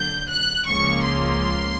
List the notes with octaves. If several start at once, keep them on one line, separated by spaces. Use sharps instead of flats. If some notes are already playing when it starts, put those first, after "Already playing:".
Already playing: D#2 D3 F#3 G6
F#6
C#2 C#3 F3 A#3 C#6
C6